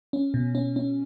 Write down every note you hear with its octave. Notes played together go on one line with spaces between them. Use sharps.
C#4
B2
C#4
C#4